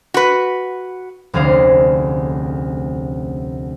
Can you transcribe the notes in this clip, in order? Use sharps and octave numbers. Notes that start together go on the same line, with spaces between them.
F#4 B4
F1 D2 C#4 G#4 C5 F5